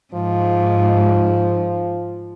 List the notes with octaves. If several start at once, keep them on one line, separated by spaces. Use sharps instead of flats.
G#2 F3